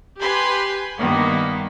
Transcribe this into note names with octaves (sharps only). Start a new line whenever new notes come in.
G4 B4 G#5 B5 C6
G2 D#3 A#3 B3